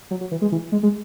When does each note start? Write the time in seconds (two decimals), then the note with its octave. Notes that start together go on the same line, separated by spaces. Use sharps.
0.11 F#3
0.21 F#3
0.31 E3
0.42 G#3
0.52 E3
0.72 G#3
0.83 G#3